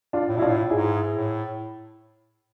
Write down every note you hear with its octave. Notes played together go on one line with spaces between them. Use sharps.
D4 F4
A2
B2 E4
D4 F4
A2
G#2 E4 G#4
A2